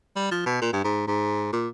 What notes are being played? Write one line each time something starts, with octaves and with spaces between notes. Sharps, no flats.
G3
F3
B2
A#2
G2
G#2
G#2
A#2